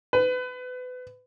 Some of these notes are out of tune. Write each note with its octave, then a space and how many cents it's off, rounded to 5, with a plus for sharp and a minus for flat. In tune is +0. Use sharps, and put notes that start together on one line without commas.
B4 +30